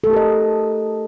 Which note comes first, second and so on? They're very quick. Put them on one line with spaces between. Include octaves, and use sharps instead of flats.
A4 A3 G4 A#4 D#5